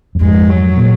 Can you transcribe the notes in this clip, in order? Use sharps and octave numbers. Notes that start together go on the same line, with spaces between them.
F#2
F2 G#2 G#3
F#3
A#2